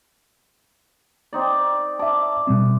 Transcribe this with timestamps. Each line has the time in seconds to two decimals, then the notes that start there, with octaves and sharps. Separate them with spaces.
1.33 C4 D#4 D5
1.99 D5 E5 A5 D6
2.47 B2 G3 C4